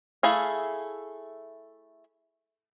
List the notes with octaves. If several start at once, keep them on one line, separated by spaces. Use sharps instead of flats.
A3 E4 G#4 F5